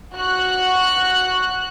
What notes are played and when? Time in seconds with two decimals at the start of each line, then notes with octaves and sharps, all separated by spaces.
0.15 F#4 F#6